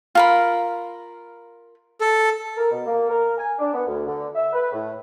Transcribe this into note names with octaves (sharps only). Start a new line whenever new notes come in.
F4 A#4 B5
A4
A#4
B2
A#3
A#4
G#5
D4
B3
D2
D3
E5
B4
A2